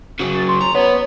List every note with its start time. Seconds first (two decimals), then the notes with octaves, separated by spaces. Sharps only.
0.20 C#3 F#3
0.34 A6
0.48 C6
0.61 A#5
0.75 B3 C#5